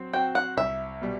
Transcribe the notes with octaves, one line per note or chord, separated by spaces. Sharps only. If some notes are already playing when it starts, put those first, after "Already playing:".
Already playing: F#3 C4 C5
C4 F#4 C5 G5
F#5
C2 E5
B2 G3